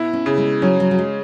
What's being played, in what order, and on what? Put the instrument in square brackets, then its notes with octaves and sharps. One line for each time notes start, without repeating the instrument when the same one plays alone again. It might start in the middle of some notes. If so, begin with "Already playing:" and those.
Already playing: [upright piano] B2 E4
[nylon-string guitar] C#4
[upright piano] C#3
[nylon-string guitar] G#3
[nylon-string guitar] F#3 [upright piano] C#4
[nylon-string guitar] F#3
F#3
G#3